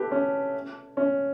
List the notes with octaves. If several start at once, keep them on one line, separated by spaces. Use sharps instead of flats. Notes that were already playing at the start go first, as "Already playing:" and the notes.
Already playing: G4 A4 B4
C#4
C#4